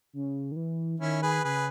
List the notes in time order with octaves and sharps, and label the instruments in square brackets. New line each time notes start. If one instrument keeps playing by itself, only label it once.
[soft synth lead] C#3
D#3
E3
[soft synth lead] D#3 [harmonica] C#4 E4
[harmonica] G#4 B4
[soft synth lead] C#3 [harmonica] G#4 B4